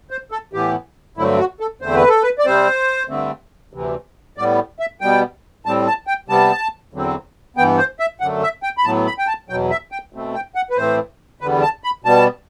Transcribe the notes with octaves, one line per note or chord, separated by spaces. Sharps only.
C5
A4
A2 E3 B3 G4
G2 D3 F#3 A3 C4 E4
F#4
A4
E2 D3 A3 C4 C5
B4
A4
B4
D5
C3 G3 C4 C5
G2 D3 A3 C4
D2 C3 E3
A2 G3 B3 D5
E5
B2 G3 B3 G5
A2 G3 C4 A5
A5
G5
C3 G3 B3 A5
E2 D3 F#3 C4
G2 E3 B3 G5
C5
E5
F#2 D3 A3 F#5
E5
G5
B5
A2 F#3 B3 A5
B5
G5
A5
E2 B2 F#3 G5
E5
G5
B2 A3 C4
G5
F#5
B4
A2 E3 A3 C4 C5
E2 D3 G3 B3 B4
A5
B5
B2 G3 B3 A5